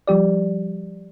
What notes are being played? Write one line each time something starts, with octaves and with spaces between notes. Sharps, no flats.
F3 G3 G4 D5